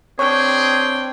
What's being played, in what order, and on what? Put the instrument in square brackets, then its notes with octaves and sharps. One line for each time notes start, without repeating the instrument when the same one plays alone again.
[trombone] C4 [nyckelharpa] D4 G5 [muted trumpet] G#4 [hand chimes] C#5 C#6